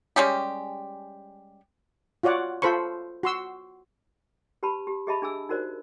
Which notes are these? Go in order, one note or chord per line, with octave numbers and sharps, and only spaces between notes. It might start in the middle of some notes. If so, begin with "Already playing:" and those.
G3 G#3 C#4 G4
F4 F#4 C#5 D5 F#5
F4 A4 C5 B5 C#6
F#4 C6 E6
G4 B4 A5 B5
G4
G4 G#4 D#5 E5 A5 B5
D4 G#4 G#5 E6
D#4 F#4 A#4 C5 D5